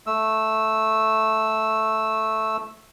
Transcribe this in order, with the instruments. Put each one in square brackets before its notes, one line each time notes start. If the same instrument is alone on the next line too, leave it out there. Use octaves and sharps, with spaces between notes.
[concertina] A3 E6